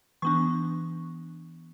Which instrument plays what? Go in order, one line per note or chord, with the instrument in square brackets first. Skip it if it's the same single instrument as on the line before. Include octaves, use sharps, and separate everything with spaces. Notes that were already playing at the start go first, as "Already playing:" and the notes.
[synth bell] E3 B3 D4 C#6